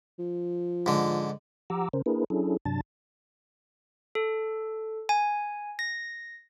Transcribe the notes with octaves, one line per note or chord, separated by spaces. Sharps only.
F3
G#2 D3
F3 G4 F#5 A#5 D6 E6
C#3 C#4 A#4 C5
A#3 D4 E4 G#4 A#4 B4
F#3 C#4 D4 E4 G#4 A4
G2 C3 F#3 D4 A5 A6
A4
G#5
A#6